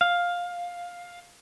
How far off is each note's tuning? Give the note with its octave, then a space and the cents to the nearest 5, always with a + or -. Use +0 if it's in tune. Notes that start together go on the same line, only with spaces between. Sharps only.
F5 +10